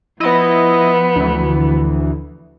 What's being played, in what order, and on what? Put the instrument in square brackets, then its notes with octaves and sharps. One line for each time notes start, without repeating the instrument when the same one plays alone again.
[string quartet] F3 B3 [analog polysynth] E4 D#5
[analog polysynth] D2 E3